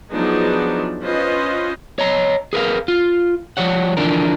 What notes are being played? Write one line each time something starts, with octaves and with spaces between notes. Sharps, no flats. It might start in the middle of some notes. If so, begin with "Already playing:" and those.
F3 F#3 B3 D4 D#4 G#4
C#4 F4 B4 C5 D#5
C#5 D#5 A#5
G#4 A#4 B4 F5
F4
F3 G3 C#5 F#5
D3 E3 F3 C#4 D4 A#4